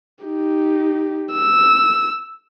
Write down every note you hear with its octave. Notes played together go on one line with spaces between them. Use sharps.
D#4 G4
E6